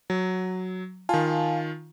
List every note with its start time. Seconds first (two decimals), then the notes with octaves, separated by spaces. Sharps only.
0.10 F#3
1.09 D#3 F4 F5 G#5 A5